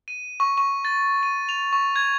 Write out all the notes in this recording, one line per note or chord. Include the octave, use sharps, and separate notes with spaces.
D#7
C#6
C#6
A6
D#7
F7
C#6
G#6